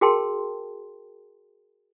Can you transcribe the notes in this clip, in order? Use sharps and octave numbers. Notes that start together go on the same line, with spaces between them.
F#4 G#4 A#4 G5 A5 C6